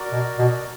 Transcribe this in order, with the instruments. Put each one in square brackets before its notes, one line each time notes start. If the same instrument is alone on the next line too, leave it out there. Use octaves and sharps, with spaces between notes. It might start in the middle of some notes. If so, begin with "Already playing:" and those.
Already playing: [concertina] F#4 A#4 D5
[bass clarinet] B2
B2